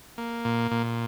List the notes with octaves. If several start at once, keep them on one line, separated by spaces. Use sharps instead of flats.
A#3
A#2
A#2